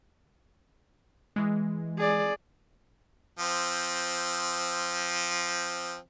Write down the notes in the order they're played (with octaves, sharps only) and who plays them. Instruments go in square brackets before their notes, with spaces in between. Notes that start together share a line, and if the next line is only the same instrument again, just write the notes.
[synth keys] E3 G#3
[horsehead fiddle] G#4 D5
[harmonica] F3 C4